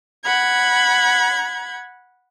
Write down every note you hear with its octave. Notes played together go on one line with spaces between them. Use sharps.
F#5 B5 G#6